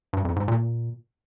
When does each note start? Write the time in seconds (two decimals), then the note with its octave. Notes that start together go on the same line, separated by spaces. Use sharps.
0.13 G2
0.25 F2
0.36 G#2
0.48 A#2